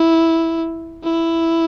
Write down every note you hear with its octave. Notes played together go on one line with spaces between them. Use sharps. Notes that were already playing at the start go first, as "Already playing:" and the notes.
Already playing: E4
E4